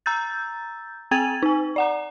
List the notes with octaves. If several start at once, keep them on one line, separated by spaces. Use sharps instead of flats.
A#5 E6 G6 A6
C4 G5 G#5 G#6 A6 D#7
D#4 G#5
D5 F#5 A#5